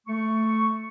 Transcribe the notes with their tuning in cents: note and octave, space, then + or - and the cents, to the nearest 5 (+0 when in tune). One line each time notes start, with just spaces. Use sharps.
A3 +0 C#6 +0